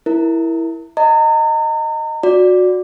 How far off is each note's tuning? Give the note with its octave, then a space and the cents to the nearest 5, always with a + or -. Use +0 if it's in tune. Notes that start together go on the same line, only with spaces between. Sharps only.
E4 +0 A#4 +0
D#5 -10 A#5 -35
F#4 -20 D5 +0